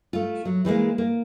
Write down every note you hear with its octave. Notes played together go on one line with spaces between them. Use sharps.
A3 F4
F#3
E3 G3 G#3 A#3
A#3